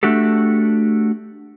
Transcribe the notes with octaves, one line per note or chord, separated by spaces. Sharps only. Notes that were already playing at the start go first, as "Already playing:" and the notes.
A3 D4 F#4 G4 A4